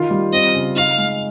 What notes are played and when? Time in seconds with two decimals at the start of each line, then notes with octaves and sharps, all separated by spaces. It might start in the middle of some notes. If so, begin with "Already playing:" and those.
Already playing: D#3 F4
0.11 G3
0.32 C4 D#5
0.54 C#3
0.76 D#4 F5
0.98 G#3